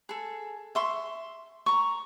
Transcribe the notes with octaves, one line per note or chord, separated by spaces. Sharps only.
G#4 A4
E5 C6 C#6
A#5 C#6